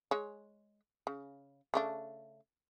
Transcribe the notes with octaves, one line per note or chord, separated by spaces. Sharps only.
G#3 C#5
C#3
C#3 A3 D4